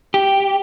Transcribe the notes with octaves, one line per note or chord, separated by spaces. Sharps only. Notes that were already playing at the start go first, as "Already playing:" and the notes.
G4